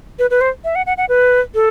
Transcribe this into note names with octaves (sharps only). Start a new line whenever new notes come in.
B4
B4
C5
E5
F#5
F#5
F#5
B4
A4